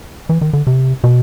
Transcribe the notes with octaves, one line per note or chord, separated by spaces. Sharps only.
E3
D#3
D3
C3
B2